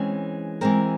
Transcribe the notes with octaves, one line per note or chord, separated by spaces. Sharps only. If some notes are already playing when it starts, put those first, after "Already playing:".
Already playing: E3 G#3 C4 C#4
E3 G#3 C4 A#4